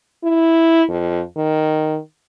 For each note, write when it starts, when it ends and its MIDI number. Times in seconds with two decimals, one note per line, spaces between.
0.23 0.83 64
0.89 1.21 41
1.36 1.98 51